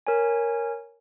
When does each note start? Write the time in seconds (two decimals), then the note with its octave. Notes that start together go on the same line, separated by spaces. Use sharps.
0.07 A#4 C#5 G#5